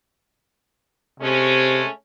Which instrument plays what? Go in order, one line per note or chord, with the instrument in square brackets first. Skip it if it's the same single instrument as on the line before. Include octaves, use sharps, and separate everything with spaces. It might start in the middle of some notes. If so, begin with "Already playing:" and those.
[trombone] C3 [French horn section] G#3 A3 C#4